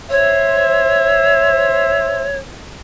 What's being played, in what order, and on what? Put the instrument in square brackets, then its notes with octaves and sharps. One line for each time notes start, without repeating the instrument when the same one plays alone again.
[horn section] C5 E5 [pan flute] C#5